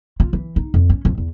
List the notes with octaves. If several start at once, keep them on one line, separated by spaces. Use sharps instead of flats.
F4
E3
D#4
F2
C#4
F2
E2